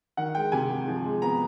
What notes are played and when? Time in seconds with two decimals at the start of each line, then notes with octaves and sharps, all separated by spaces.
0.17 D#3 F#5
0.35 G#3 G5
0.52 C3 G#5
0.70 C3
0.88 F3
1.04 G#3
1.22 B3 A#5